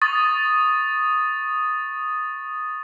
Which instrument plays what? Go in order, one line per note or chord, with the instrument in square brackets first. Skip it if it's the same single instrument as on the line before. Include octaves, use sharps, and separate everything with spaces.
[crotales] C#6 D#6 A6